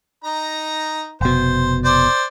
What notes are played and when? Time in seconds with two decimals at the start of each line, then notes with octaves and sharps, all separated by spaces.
0.24 D#4 A#5
1.21 F1 B2 C5
1.84 C5 D5